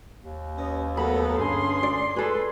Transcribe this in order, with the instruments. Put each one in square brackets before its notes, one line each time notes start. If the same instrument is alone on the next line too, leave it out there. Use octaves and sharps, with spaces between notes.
[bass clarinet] D#2
[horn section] C#4 B4 D#5
[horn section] F#3 A3 B3 [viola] A4 A#4 [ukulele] B5
[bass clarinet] G2 [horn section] D3 C#4 G#4 [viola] C6
[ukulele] D5
[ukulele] G#4 A4 [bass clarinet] B4